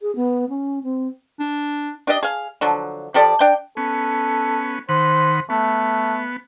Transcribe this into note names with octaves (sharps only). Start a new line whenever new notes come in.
G#4
B3
C#4
C4
D4
D4 G4 D5 D#5
G#4 F5
D3 F3 F#3
F3 G4 A4 D5
D4 G5
B3 C#4 A4
D#3 C5 F#5 B5
A3 B3